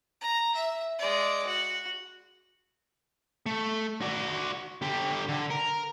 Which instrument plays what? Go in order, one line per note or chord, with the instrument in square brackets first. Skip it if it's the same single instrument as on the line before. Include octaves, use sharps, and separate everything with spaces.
[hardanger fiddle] A#5
E5
G#3 D5
F#4
[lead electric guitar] A3
F#4 D5
D3 G4
D3
A#4